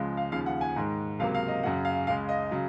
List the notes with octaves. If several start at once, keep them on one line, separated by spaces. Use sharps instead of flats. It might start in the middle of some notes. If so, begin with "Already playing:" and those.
Already playing: C#2 C#3 F3 G#3
F5
D#2 C#3 F3 F5
F#5
G#5
G#2 D#3 G#3
C#2 C3 F#3 A#3 F5
F5
D#5
F#2 C#3 F#3 F#5
F5
C#2 C#3 G#3 F5
D#5
C#3 F#3